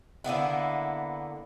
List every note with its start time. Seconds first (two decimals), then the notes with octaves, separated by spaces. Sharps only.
0.24 D3 A#3 B3 E4